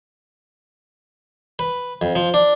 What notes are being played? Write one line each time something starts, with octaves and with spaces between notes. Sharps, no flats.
B4
F2
F3
D4